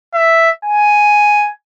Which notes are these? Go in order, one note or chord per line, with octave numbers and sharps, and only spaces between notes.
E5
G#5